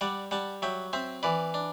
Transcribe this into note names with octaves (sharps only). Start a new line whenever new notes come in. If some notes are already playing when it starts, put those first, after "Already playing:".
G3 D5 F#5
G3 F#5 A5
F#3 E5 G5
C4 C5 E5
E3 B4 D5
D4